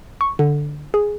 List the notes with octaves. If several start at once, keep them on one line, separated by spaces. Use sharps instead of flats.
C#6
D3
G#4